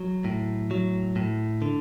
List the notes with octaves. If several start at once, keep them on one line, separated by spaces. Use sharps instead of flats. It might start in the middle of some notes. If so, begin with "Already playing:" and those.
Already playing: F#3
A2
F#3
A2
D3